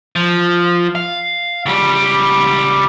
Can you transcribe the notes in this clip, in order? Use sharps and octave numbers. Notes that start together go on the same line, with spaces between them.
F3
F5
C#2 G3